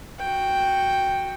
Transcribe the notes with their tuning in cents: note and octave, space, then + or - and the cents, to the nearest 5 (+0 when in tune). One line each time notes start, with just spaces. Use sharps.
F#4 +0 G5 +0